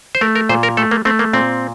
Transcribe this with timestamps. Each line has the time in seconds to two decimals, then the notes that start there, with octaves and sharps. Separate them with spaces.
0.15 C5
0.21 A3 A#4
0.35 A#4
0.49 A#2 C5
0.63 A#4
0.77 A3 A4
0.91 A#3
1.05 A3 C4
1.19 A#3
1.33 A#2 C4